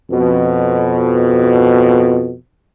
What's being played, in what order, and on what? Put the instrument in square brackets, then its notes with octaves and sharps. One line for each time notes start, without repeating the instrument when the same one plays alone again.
[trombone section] F2 B2